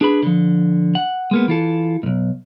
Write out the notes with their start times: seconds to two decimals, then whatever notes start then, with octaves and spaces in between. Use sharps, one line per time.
0.01 D4 G#4 B4 B5
0.23 D3 F3
0.95 F#5
1.31 G#3 A#3 B3
1.48 E3 F4 A4
2.03 B1 G#2